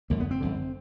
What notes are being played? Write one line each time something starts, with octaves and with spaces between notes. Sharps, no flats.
G#1 F#2 D3 A#3
B3
C4
G#1 F#2 D3